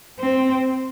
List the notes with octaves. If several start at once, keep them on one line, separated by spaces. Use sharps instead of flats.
C4